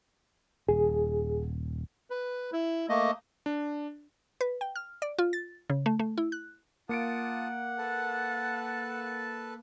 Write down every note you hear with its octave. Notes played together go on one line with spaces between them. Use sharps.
D#1 G#4
B4
E4
A3 A#3 D#5
D4
B4
G5
F6
D5
F4
A6
C#3
A3
A3
E4
F#6
A#3 F4 F#5 A5 D#6 C#7 D7
A4 B4 A5